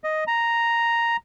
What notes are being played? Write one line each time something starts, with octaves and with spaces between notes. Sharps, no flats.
D#5
A#5